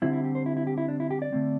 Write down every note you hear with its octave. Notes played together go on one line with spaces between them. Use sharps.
D3 G3 C4 E4
E4
G4
C5
E4
E4
G4
E4
D4
E4
G4
D5
D3 A3 C4